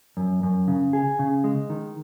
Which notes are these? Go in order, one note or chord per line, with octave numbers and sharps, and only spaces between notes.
F#2
F#2
C#3
G#4
C#3
G#3
D#3